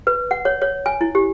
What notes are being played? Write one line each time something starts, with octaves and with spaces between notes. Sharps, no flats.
B4
F#5
C#5
C#5
G#5
E4
G4